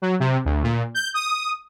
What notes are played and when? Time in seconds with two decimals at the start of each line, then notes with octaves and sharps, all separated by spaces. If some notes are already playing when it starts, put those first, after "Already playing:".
0.02 F#3
0.20 C3
0.45 D2
0.63 A#2
0.95 G6
1.14 D#6